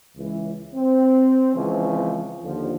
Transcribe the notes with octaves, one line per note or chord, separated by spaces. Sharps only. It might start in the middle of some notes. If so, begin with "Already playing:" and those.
C#2 E3
C4
C#2 C#3 E3 F3 C4 C#4
D#2 D3 F3